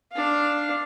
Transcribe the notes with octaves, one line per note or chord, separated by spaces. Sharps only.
D4 F5